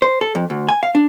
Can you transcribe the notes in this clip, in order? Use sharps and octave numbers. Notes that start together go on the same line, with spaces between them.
C5
A4
F2
D2
G#5
F5
D4